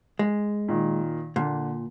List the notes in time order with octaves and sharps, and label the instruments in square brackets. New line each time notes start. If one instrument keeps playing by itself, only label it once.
[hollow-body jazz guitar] G#3
[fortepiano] A#2 D#3
[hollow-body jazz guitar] A#2 [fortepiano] D3